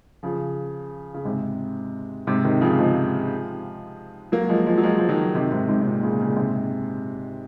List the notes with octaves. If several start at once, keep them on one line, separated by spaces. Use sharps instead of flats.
C#3 F3
C#3
G#2 C3
G#2 C3
C3 D#3
C#3 F3
F3 G#3
F#3 A#3
F3 G#3
F3 G#3
F#3
F3 G#3
F3
D#3 F#3
C3 D#3
G#2 C3
G#2 C3
C3
A#2
A#2 C#3
A#2 C#3
G#2 C3